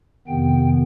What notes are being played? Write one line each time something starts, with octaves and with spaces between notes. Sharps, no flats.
F2 C3 D#3 B3 G5